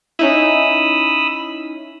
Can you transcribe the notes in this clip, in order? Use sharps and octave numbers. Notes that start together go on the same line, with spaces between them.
C#4 D#4 E4 B5 D#6 E6